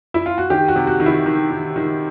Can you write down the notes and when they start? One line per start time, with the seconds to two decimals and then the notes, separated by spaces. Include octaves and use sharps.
0.14 E4
0.26 F4
0.38 F#4
0.50 D#3 G4
0.68 F#4
0.76 C3
0.87 F#4
1.00 D#3
1.06 E4
1.26 D#3
1.50 D#3
1.76 D#3